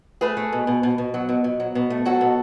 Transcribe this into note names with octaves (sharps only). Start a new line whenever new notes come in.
A3 G#4 B4
A3
B2
B2
B2
B2
F#3
B2
B2
F#3
B2
A3
F#3 F#4 A4
B2